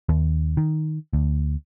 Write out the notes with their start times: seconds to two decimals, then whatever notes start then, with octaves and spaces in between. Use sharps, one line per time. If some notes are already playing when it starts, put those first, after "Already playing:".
0.09 D#2
0.57 D#3
1.13 D2